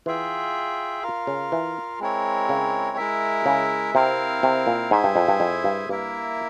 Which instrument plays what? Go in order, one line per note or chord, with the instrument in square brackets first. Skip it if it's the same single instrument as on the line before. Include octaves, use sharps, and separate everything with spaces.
[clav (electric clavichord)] E3 [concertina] F4 G#4 E5 G5
[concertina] F4 A#4 F5
[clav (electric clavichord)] C#3
E3
[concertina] G#3 C4 E4 A#4 C#5
[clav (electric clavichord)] C#3
[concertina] G#3 E4 A#4 E5
[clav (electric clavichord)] C#3
[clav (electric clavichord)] C3 [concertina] C4 E4 A#4 F5
[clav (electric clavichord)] C3
A#2
[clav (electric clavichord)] G#2 [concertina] E4 G#4 C5 E5 G#5
[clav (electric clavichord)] G2
F2
G2
F2
G2
[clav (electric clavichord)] G2 [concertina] A#3 E4 A#4 E5